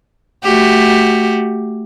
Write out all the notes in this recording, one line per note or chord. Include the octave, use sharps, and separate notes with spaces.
A3 F#4 G4